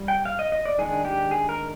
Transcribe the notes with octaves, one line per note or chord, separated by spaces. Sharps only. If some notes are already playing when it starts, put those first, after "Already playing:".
Already playing: G3
G5
F5
D#5
D#5
D5
D#3 G#3 D4 G#4
G4
G#4
A#4